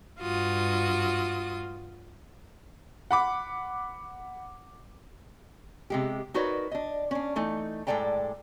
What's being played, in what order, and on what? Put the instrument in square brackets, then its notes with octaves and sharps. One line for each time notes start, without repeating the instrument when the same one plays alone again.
[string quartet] G2 F4 F#4 D#6
[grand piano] F#5 B5 D6
[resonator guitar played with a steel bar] C3 G#3 G4
D#4 F#4 A#4 B4 C#5 D5
D4 D#5
C#4 D4
E3 A3 D#4
A2 G#3 A4 D5 G5 A#5